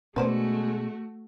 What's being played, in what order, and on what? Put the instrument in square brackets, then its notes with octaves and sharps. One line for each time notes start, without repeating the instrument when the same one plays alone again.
[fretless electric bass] B2 C#4 [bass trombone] G#3 [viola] A3 F#4 [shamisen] B4 C5 D5